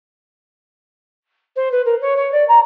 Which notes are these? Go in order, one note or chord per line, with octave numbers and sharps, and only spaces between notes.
C5
B4
A#4
C#5
C#5
D5
A#5